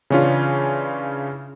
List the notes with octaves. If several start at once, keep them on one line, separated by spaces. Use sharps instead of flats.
C#3 E3 C#4 D4 F4